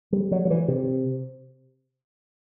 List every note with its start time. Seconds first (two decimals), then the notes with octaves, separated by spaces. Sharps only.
0.13 G3
0.31 F#3
0.45 F#3
0.50 E3
0.68 C3